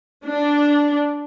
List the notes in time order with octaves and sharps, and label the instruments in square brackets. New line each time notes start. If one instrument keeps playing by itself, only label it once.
[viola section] D4